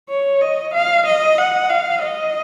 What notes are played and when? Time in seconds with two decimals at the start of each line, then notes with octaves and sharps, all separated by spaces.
0.10 C#5
0.42 D#5
0.74 F5
1.06 D#5
1.38 F#5
1.70 F5
2.02 D#5